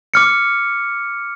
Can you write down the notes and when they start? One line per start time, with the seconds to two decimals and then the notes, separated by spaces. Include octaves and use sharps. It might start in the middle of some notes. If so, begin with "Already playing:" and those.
0.14 D6 F6 C#7